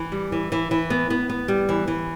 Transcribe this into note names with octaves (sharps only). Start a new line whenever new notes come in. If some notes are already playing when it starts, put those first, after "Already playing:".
Already playing: E3
G3
E3
E3
E3
B3
B3
B3
G3
E3
E3